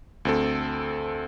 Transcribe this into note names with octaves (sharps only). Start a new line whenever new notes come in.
D2 C4 A4